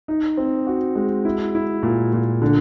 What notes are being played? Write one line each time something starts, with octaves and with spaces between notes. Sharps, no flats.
D#4
C4
F#4
G#3
E4
E4
A#2
A#2
D3